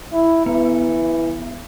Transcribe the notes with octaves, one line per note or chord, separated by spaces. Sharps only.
E4
E3 B3